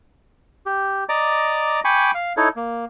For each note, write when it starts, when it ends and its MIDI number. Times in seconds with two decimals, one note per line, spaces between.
0.66 1.04 67
1.09 1.80 74
1.09 1.80 75
1.09 1.80 82
1.09 1.80 86
1.85 2.11 79
1.85 2.11 80
1.85 2.11 83
1.85 2.11 85
1.85 2.11 86
2.14 2.33 77
2.37 2.48 63
2.37 2.48 64
2.37 2.48 69
2.37 2.48 73
2.56 2.85 58